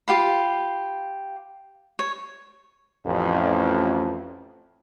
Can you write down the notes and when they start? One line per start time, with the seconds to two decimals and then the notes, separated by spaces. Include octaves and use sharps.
0.08 F4 G4 F5 B5
1.99 C#5
3.06 A1 F2